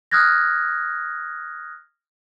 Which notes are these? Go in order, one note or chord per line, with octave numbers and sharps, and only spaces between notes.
D#6 F6 F#6 G#6 A#6